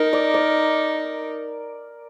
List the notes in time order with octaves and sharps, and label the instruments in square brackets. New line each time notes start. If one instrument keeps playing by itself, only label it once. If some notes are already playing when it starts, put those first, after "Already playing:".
Already playing: [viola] D#4 [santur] A#4
[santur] D5
D5